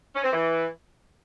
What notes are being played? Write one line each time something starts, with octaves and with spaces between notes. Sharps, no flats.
C#4
C4
E3